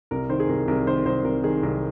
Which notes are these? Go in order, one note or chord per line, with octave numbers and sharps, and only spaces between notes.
C2 A#4
D#3 C5
G#4
C2 A#4
C2 A#4
D#3 C5
C2 C5
C2 A#4
D#3 G#4
C2 A#4